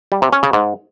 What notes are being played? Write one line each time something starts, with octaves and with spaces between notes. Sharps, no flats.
G3
C3
C#4
C#3
G#2